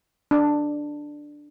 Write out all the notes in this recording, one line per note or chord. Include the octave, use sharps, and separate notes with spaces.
D4